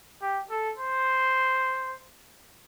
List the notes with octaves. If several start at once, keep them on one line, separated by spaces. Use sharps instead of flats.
G4
A4
C5